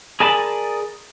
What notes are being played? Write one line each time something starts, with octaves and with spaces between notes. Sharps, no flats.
G#4 A#4 D5 G#5 A5 B5